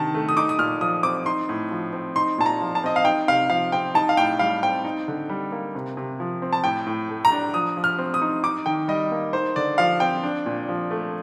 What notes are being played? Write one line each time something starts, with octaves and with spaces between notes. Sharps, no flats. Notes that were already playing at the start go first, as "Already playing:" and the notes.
Already playing: C3 D#3 D4 A5
A3
D#6
D#4 D6
D#6
A#2 F6
F3 D#6
C4 D6
D#4 C6
A2
F3
C4
D#4 C6
A#2 A5
A#5
F3
A5
C4 D#5
F5
D#4 G5
C3 F5
F3 F5
C4 G5
D#4 A5
F5
A2 G5
G3 F5
C4 G5
D#4
D3
G3
A#3
C3
C3
F3
C4
A5
A2 G5
A2
A3
A#5
D4
F3 D#6
F3
F6
C4
D#6
D#4
D#4 D6
D#3 G5
G3 D#5
A#3
D#4 C5
D3 D5
F3 F5
C4 G5
D4
A#2
F3
A3